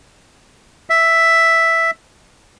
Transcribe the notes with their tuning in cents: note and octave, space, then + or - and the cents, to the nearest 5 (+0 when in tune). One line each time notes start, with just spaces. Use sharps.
E5 +0